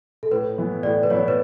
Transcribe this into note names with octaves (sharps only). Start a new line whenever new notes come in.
A4
A2 B4
E3 B3 E4
A2 D5
B4
E3 B3 E4 C#5
B4